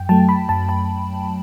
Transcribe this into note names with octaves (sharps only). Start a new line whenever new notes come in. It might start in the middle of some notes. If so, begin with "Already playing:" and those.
Already playing: F#2 G5
F#3 A3 A5
B5
F#2 A5
A5